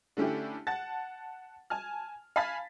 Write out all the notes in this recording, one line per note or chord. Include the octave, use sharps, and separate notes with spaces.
D3 A3 C#4 E4 G4
F#5 A5 A6
G#5 A5 F6
F5 G#5 A5 B5 A6 B6